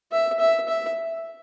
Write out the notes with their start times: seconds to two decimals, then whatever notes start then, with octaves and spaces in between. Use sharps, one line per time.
0.12 E5
0.39 E5
0.68 E5